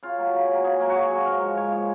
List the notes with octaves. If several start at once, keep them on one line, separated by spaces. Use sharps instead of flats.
C#3 F4
F#3 A#3
C#3
F#3 A#3
C#3 G#4
F#3 A#3
F#4
C#3 G#4
F#3 A#3
G#2 A#4
F3 G#3
G#2 C#5
F3 G#3 C#5